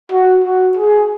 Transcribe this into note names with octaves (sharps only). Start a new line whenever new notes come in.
F#4
F#4
G#4